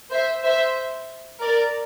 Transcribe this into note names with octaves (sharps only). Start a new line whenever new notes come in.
C5 E5
C5 E5
A#4 D5